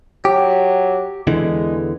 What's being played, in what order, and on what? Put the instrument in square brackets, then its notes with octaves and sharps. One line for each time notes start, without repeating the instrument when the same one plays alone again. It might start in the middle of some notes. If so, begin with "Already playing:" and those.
[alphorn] F#3 [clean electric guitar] G4
[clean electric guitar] E2 D3 E3 [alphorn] G#3